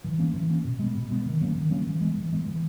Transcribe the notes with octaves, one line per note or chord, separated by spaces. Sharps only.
E3
A#3 C#4
E3
A#3 C#4
B2
G#3 B3
B2
G#3 B3
D#3
F#3 A#3 C#4
D#3
F#3 A#3 C#4
E3
G#3 B3
E3
G#3 B3
E3